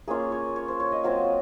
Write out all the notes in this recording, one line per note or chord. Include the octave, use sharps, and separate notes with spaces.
A#3 C#4 F4 G#4
C#5
C#5
C5
C#5
D#5
F#3 C4 F4 F5